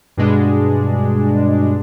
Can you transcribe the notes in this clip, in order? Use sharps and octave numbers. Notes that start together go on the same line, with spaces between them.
G2 B2 G#3 D4